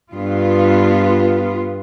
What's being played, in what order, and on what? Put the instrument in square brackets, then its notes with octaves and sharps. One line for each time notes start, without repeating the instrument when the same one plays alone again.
[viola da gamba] G2 [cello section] B3 F4